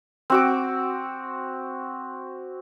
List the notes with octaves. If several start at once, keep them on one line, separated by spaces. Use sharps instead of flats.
C4 F#4 D6